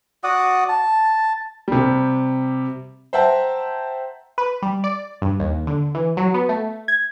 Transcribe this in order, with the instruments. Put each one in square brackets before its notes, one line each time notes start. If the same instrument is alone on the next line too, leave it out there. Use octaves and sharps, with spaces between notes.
[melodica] F#4 D5 F#5 D#6
A5
[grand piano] C3 G3
C5 E5 F#5 G5 A5 A#5
[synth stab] B4
G3
D5
G2
D#2
D3
E3
F#3
B3
A3
G#6